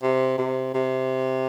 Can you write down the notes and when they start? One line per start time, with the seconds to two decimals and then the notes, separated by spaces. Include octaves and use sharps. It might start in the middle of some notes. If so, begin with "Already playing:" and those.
0.02 C3
0.38 C3
0.74 C3